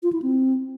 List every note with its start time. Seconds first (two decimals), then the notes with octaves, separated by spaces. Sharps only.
0.03 F4
0.13 E4
0.22 C4